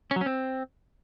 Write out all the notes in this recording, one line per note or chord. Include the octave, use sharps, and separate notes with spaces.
C#4
F#3
C#4
C4